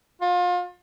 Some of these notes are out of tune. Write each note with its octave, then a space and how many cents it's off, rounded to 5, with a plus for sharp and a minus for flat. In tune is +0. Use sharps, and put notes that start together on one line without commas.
F4 +30